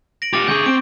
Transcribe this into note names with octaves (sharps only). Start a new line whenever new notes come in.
A#6 D7 F#7
F4 G4 D6 A6
D3 G#4 C#6 D6 G6
C4 D7